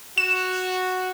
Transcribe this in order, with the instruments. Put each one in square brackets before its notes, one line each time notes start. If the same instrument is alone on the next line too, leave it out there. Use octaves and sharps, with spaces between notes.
[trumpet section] F#4 [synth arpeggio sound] E7